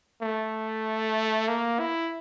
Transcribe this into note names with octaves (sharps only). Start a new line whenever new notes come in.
A3
A#3
E4